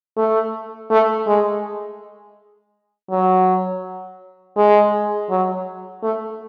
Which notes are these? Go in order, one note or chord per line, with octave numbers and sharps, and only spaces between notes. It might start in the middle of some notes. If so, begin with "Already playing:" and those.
A3
A3
G#3
F#3
G#3
F#3
A3